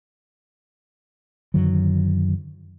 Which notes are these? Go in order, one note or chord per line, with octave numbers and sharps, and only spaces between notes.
F#2 D3 D#3 F#3